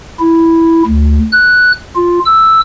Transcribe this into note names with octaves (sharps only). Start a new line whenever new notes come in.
E4
D2
F#6
F4
E6